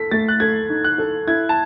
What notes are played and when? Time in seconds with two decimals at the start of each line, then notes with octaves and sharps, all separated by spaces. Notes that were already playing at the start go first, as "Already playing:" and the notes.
Already playing: A4 B6
0.11 A3 A6
0.28 F#6
0.40 A4 G#6
0.70 D#4
0.84 F#6
0.98 A4
1.27 E4 G#6
1.49 A5